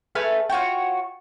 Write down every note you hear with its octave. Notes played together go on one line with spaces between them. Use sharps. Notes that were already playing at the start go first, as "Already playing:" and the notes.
A3 B4 G#5 F6
F4 F#4 C#5 G5